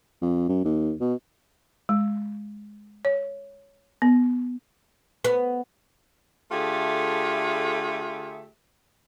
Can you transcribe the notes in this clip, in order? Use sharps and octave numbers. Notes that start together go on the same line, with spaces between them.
F2
F#2
D#2
B2
G#3
C#5
B3
B3
D3 A3 F4 G4 G#4 E5